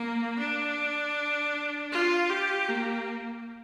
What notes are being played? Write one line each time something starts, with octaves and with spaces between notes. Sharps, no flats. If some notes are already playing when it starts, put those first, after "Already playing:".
Already playing: A#3
D4
F4
G4
A#3